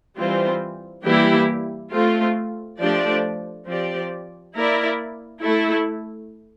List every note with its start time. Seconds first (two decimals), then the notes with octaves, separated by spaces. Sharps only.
0.18 E3 G3 C4 F4 C5
1.05 E3 G3 A#3 E4 G4
1.93 A3 C4 F4
2.80 F3 A3 D4 G4 D5
3.68 F3 C4 G4 D5
4.55 A#3 E4 A#4 D5
5.43 A3 E4 A4